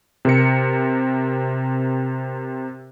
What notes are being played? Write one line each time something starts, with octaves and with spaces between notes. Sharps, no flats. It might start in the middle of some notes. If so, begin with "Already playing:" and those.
C3 A#4 C#7